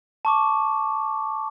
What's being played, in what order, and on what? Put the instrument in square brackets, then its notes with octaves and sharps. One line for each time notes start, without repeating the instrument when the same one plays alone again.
[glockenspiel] A5 C#6 D6